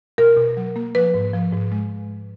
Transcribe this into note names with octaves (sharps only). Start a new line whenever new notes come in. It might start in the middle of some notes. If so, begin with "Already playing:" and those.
B2 A#4
B2
F#3
A#3
F3 B4
G#2
F3
G#2
G#3